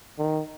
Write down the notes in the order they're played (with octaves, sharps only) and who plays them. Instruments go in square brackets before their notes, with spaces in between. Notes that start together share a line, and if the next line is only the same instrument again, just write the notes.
[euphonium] D#3